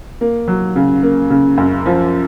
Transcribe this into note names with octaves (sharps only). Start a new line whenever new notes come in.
A#3
F#3
C#3
A#3
C#3
F#2
F3